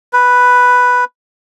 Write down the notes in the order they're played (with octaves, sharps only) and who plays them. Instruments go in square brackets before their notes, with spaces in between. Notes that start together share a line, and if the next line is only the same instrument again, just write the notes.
[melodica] B4